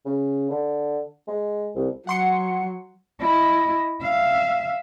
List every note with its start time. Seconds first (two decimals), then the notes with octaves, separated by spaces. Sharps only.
0.06 C#3
0.50 D3
1.28 G#3
1.75 C2
2.07 F#3 F#5 C6 C#7
3.20 E4 D#5
4.02 E5 F5